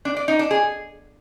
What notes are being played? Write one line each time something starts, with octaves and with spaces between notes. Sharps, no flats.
D4
D5
D#4
D4
G#4